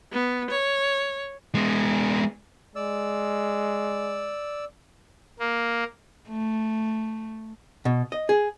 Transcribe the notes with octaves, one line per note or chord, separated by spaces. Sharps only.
B3
C#5
G#3 B3
G#3 D5 E6
A#3
A3
B2
D#5
G#4